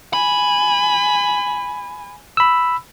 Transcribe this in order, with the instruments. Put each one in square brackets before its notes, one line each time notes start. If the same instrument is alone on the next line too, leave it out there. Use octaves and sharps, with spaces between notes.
[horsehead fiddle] G#5 [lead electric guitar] B5
[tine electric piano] B5 E6